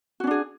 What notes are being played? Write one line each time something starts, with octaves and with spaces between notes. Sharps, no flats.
C#4 D4 F#4 G#4